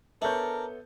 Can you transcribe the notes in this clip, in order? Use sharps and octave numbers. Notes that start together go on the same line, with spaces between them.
B3 D4 A4 A#4 C#5 E5 G6